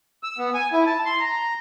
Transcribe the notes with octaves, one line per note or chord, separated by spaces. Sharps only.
E6
B3
G#5
E4
A5
C6
A#5